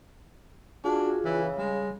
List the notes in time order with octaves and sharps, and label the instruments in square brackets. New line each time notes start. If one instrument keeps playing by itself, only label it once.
[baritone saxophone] D4 [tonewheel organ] F4 G#4 [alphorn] F#4
[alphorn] C#3 [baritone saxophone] E3
[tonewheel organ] G3 [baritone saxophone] G#3